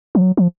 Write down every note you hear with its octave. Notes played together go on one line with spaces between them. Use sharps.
F3
F#3
F3